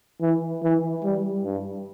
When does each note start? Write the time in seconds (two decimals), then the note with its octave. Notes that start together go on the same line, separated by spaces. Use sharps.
0.21 E3
0.63 E3
1.04 G3
1.44 G2